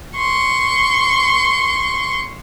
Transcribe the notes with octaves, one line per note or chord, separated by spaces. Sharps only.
C6 C#6